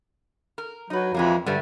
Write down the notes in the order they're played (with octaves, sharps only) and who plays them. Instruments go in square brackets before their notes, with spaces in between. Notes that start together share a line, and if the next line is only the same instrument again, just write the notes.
[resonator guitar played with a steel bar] A#4
[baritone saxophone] F#3 [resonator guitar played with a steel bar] D#4 B4
[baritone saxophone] F2 [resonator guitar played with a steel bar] E3 G#3 A#3
[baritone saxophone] G2 [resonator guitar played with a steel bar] D3 G3 A3